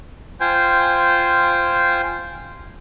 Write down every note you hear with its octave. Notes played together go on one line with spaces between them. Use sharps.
F4 C5 G5 G#5